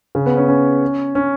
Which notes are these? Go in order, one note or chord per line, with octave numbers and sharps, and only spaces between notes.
C#3
B3
C#4
C#4
C#4